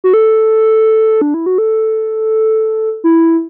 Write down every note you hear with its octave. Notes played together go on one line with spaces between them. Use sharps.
F#4
A4
D4
E4
F#4
A4
E4